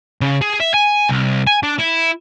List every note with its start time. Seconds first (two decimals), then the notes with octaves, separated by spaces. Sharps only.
0.21 C#3
0.42 G#4
0.60 E5
0.74 G#5
1.09 C2
1.47 G#5
1.63 D4
1.78 E4